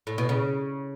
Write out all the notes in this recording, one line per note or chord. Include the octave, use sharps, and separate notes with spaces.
A2
B2
C#3